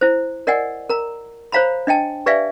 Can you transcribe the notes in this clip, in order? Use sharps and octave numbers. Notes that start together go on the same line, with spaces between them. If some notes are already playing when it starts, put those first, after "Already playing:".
E4 C5
A#4 D5 D#5 F#5 G#5
A#4 A#5
C5 C#5 F5 A#5 B5
D4 D#5 G5 A5
G4 B4 D5 E5 F5 G#5